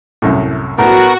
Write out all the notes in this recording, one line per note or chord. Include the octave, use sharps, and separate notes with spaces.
C2 F#2 A2
A2 B3 F#4 A#4